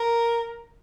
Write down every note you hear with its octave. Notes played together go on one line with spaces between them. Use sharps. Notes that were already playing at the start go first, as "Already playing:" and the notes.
Already playing: A#4